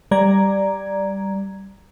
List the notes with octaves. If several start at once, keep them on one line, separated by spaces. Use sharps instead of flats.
G3 D5 A#5 G#6